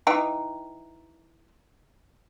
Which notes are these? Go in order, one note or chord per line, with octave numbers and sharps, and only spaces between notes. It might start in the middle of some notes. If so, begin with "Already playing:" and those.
E3 D#4 G5